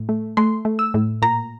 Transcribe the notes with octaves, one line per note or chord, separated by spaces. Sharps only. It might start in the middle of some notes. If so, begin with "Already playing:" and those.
Already playing: A2
A3
A3 C6
A3
E6
A2
A#2 A#5